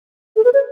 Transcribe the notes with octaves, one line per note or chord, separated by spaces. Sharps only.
A4
B4
C#5